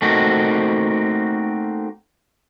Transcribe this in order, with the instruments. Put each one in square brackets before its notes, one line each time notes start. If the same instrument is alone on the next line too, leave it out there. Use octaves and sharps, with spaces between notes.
[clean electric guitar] A3 A#3 C4 D#4 F#4